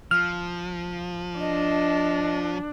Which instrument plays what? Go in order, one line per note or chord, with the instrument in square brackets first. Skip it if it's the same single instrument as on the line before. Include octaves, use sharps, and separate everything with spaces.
[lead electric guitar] F3 [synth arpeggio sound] F6
[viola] D4 [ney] D#5